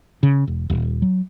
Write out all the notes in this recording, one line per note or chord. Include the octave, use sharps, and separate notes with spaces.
C#3
E1
D#1
F#3